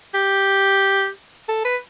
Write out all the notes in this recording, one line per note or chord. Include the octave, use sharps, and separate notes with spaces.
G4
A4
B4